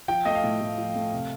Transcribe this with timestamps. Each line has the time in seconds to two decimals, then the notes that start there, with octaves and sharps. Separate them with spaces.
0.08 F3 G5
0.25 A3 D#5
0.35 F5
0.44 A2
0.61 A2
0.78 F3
0.95 A3
1.13 C3